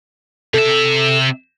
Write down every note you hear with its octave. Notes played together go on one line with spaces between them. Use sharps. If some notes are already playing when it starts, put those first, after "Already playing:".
C3 A4 E5